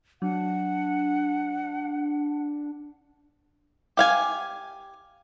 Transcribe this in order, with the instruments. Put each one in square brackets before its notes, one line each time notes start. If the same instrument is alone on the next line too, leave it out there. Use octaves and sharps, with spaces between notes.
[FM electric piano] F#3 [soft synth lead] D4 [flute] F#5
[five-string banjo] G4 F5 G#5